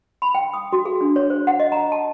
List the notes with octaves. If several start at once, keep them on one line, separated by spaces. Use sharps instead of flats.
B5
G5
D#6
F#4
G#4
D4
C#5
C5
F#5
D#5
A#5
A5